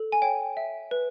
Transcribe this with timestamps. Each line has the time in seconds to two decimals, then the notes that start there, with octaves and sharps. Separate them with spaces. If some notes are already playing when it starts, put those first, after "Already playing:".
Already playing: A4
0.12 G#5
0.22 C#5 G5
0.57 E5
0.91 B4